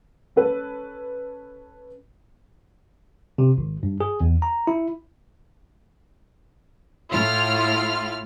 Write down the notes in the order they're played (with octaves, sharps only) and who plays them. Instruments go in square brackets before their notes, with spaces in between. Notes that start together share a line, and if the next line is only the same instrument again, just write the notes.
[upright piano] C#4 A4 B4
[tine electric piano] C3
G#1
G2
G#4
E2
A#5
E4
[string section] A2 E4 F4 F6